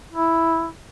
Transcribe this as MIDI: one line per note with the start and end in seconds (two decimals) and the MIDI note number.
0.13 0.68 64